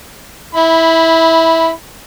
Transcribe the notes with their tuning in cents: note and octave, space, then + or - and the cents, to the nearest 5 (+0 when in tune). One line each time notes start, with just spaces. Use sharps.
E4 -15 B5 +0